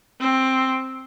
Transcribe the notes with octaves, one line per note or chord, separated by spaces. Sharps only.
C4